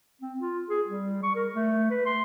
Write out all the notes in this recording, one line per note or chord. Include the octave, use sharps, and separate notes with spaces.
C4
F4
G#4
G3
C#6
A#4
A3
B4
C6